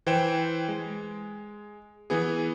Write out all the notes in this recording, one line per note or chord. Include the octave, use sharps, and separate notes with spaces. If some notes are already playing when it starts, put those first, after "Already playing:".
E3 C5 G5 E7
G#3
E3 B3 G#4